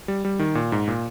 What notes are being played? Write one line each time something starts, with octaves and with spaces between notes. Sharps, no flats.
G3
G3
D#3
A#2
G#2
A#2